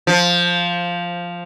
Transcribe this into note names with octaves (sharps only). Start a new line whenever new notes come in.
F3